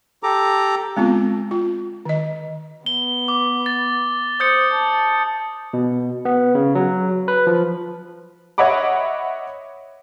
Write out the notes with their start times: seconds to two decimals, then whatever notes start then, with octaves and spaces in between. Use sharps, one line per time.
0.23 G4 A4 A#5 D6
0.97 G#3 B3 C4 F4
1.51 F4
2.05 D#3 D#5
2.86 B3 G7
3.28 D6
3.66 A6
4.40 C5 D#6 G6 C#7
4.72 A5
5.73 B2
6.25 B3
6.55 C#3
6.75 F#3
7.28 B4
7.47 F3
8.58 C#5 D#5 E5 F#5 B5 D6